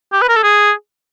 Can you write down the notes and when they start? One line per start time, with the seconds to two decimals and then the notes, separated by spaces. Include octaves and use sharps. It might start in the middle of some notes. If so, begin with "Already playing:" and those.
0.13 G4
0.22 B4
0.29 A#4
0.36 A4
0.43 G#4